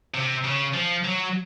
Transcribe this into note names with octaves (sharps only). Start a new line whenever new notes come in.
C3
C#3
F3
F#3